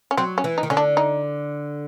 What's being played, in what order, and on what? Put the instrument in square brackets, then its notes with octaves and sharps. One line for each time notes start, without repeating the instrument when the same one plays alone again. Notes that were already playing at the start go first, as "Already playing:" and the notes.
[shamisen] C#4
[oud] F#3 [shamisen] C4
[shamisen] C#4
[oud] E3
[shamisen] D#4
[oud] D#3
[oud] D3 [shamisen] C#4
[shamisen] D4
D#4